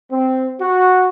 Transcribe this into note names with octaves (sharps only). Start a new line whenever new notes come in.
C4
F#4